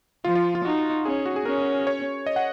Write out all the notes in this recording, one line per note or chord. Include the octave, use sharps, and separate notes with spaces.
F3 F4
F4
F4
D#4 F#4
C#4 G#4
F#4
G#4
C#4 A#4
C#5
D#5
F#5